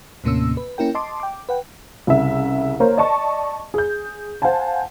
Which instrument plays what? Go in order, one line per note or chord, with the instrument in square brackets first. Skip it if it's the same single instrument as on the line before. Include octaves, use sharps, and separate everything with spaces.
[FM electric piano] D#2 A2 C3 A#3 C#4 E6
B4
A#3 C#4 E4 A#4 G5
D#5 A5 C6 D6
G5 D6
B4 F#5 G5
[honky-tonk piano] C2 C#3 E5
A#3 A#4 C5 C#5
D5 D#5 A5 C#6
G#4 G6
C5 F5 F#5 G#5 A5